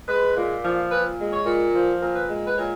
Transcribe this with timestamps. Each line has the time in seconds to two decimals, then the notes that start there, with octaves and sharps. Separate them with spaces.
0.07 G#3 B4
0.35 A#2
0.63 F3
0.90 A#2 B4
1.19 G#3
1.32 C#5
1.45 A#2
1.74 F3
2.02 A#2
2.15 B4
2.29 G#3
2.47 B4
2.56 A#2 C#5